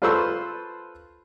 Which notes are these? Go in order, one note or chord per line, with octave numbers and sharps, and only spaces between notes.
F4 A4 B4 C5 C#6 E6